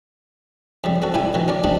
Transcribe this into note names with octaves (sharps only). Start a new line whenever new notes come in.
F2 C#3 G3
C4 F#4 A4
A2 C#3 G3 E4 G5 G#5
B2 D#3 E3
C#4 A#4 D5
C#3 G3 A#3 C4 D4 D#4